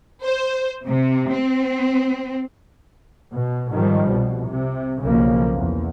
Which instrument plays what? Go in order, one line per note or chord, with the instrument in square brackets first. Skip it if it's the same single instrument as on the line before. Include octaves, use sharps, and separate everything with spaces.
[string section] C5
C3
C4
[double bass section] B2
G#2 D#3 F3 G3
C2 B2
C3
B1 C#3 F3 A#3
E2